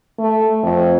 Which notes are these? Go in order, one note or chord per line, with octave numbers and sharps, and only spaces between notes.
A3
F2